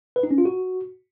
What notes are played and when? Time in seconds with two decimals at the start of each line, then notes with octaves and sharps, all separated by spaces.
0.16 B4
0.23 D#4
0.31 C#4
0.38 F4
0.45 F#4